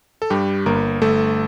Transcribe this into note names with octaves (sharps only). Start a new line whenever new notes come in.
A4
G2 G3 G4
G1 A#3 A#4
G1 A3 A4